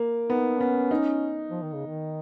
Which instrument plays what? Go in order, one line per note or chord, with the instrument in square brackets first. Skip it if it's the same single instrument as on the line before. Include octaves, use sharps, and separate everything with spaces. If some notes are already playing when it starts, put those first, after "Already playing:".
Already playing: [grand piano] A#3
[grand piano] B3 [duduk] D#4
[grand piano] B3 [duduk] C#4
[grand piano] D#4
[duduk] F3
D#3
C#3
D#3